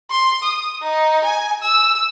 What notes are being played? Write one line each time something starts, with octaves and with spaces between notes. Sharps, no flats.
C6
D#6
D#4
G#5
E6